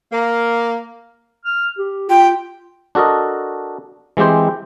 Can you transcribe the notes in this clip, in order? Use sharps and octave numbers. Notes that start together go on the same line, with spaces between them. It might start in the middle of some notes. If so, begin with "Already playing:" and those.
A#3
F6
G4
F4 G5
D4 F#4 A4 A#4 D#5
E3 G#3 C4 G4 C5